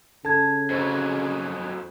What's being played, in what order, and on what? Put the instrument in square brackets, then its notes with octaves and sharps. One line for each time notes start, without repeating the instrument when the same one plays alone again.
[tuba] C#3 [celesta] A4 G#6 [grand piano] A5
[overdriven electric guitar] F2 F#3 [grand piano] C5